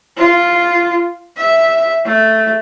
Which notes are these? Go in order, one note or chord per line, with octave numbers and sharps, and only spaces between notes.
F4
E5
A3